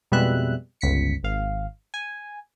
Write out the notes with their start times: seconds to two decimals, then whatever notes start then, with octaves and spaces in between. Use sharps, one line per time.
0.12 F2 B2 G3 G#3 E5 F#6
0.81 G1 C#2 B6 C#7
1.23 G#1 F5
1.94 G#5